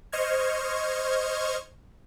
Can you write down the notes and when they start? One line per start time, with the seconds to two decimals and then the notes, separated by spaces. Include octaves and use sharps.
0.12 C5 D#5 C#6 F6 G#6